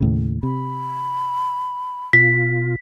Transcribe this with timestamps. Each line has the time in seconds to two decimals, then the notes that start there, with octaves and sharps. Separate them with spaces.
0.01 D#2 A2 C#3
0.43 C3 B5
2.13 B2 F4 B6